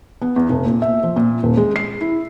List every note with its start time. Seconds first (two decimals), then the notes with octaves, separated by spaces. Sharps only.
0.22 B3
0.36 E2
0.49 F1
0.65 A#2
0.82 E5
1.03 F3
1.16 A#2
1.43 D#1
1.57 G#3
1.76 C7
2.01 E4